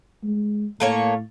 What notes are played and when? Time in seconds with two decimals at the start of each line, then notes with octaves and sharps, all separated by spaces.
0.24 G#3
0.80 A2 A3 A#3 C#5